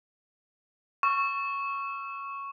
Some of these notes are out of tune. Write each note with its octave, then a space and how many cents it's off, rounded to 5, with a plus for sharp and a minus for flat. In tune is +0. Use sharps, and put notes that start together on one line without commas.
C#6 +0 E6 +45